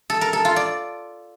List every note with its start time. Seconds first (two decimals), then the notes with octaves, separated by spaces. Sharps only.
0.10 A4
0.21 A#4
0.33 A4
0.45 F4
0.56 D5